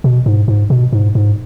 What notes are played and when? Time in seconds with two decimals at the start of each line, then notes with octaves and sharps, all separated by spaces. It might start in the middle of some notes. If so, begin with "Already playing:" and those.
0.04 B2
0.26 G#2
0.48 G#2
0.70 B2
0.93 G#2
1.15 G#2